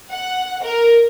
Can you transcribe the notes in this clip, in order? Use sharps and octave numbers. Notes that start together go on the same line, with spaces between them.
F#5
A#4